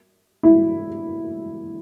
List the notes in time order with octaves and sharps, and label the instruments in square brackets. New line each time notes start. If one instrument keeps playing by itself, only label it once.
[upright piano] E4